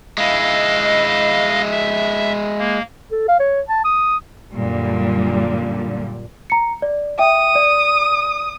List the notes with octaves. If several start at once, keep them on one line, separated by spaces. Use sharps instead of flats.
G#3 E4 D#5 F5
E5
A#3
A4
F5
C#5
A5
D#6
F#2 A#2 D3 G3
A#5 C#7
D5
E5 G5 D#6
D5